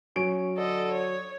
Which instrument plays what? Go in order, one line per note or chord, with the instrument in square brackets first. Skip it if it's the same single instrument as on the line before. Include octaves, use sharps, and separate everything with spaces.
[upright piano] F#3 D7 [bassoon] C#4
[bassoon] D3 [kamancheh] A4 D#5
[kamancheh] C#5